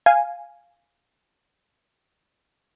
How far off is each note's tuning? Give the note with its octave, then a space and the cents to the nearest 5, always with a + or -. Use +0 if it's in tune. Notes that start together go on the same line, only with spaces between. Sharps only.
F5 +0 G#5 +0